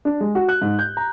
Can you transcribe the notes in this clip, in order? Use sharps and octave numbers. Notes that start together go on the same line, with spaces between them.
D4
G#3
F#4
F#6
G#2
G6
A#5